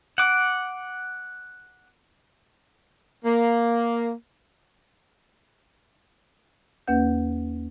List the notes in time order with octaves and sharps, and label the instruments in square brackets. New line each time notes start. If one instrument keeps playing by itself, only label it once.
[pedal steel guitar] F#5 D6
[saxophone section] A#3
[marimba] D#2 A#3 C#4 B4 F#5 G6